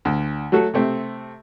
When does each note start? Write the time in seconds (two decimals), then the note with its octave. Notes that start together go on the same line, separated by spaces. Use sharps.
0.05 D2
0.52 F#3 A3 F#4 A4
0.74 C3 A3 C4